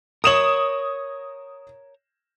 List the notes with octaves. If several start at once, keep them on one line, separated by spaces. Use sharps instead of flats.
A#4 C#5 D#6 E7 F#7